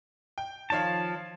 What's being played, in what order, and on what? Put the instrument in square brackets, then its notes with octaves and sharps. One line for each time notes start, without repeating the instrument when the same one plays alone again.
[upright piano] G5
[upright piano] D#3 C#5 F5 [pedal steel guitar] F3 A5